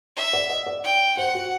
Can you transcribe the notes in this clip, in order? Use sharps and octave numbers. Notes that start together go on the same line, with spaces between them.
E5
D5
D#5
D5
G5
C5 F#5
F#4